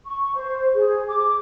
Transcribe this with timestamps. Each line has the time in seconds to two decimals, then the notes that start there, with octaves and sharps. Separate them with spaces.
0.06 C#6
0.36 C5
0.75 G#4
1.08 D6